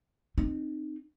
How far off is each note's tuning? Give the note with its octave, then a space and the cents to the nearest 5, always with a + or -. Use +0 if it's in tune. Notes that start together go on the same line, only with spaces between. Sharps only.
C4 +0 D#4 -25